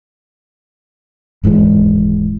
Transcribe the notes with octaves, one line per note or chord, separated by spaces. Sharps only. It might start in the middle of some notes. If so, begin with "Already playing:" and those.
D#1 G#2 E3 G#3